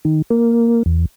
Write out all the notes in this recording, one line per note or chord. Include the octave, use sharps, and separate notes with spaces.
D#3
A#3
E2